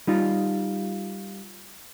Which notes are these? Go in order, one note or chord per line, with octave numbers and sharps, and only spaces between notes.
G3 D#4 F4